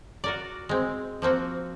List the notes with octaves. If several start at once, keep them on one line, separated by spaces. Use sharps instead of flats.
F#4 A#4 D5
G#3 C4
F3 A#3 C4 F#4